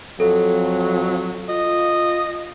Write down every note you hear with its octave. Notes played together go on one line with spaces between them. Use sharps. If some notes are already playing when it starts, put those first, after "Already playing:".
F2 F#3 A4
F4 D#5